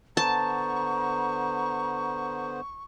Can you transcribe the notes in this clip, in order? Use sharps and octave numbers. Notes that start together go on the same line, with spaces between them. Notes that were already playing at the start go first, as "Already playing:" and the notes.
D3 B3 C5 A5 A#5 C#6